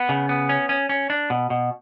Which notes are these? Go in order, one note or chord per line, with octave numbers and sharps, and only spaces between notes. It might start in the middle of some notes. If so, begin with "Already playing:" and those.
Already playing: B3
C#3
B3
C#4
C#4
C#4
D4
B2
B2